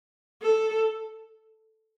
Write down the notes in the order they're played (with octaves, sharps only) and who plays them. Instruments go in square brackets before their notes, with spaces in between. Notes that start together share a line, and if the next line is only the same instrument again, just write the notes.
[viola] A4